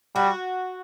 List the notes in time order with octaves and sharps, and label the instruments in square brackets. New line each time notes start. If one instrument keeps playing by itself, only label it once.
[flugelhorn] G3 [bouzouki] F#4